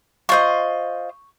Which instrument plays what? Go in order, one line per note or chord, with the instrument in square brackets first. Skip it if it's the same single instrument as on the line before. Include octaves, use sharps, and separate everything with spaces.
[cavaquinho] F4 C5 D#5 C#6